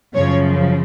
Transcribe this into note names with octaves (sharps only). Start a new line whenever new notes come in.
F#2 C#3 F3 C#5